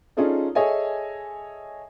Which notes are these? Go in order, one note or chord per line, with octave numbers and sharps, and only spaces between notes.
C#4 D#4 F4 G#4 A4 D5
G#4 A4 C#5 D#5 E5 G#5